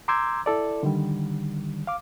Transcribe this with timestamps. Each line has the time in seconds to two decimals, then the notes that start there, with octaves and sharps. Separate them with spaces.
0.08 A#5 C6 D6 E6 G6 G#6
0.46 E4 A4 D5
0.83 D3 D#3 G3
1.87 F5 D6